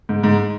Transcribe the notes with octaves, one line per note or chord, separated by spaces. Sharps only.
G#2
G#2